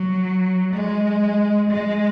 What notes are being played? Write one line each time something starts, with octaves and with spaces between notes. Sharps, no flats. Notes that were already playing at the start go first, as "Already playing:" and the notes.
Already playing: F#3
G#3
G#3